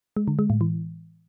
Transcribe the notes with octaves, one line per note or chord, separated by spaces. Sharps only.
G#3
D3
G#3
A2
E3